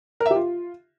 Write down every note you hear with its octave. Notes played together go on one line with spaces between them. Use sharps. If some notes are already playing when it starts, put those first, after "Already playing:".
A#4
E5
G4
F4